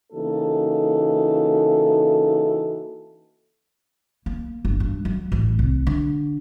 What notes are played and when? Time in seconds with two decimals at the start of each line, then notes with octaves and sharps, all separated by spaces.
0.13 C#3 E3 A#3 D#4 F#4 A4
4.26 A#3
4.65 G1
4.80 G2
5.05 F#3
5.32 A1
5.59 C2
5.87 D3